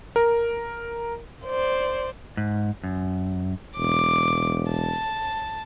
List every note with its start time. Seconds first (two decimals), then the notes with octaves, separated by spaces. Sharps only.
0.16 A#4
1.45 C5 D5
2.37 G#2
2.84 F#2
3.78 E1 D6
4.71 A5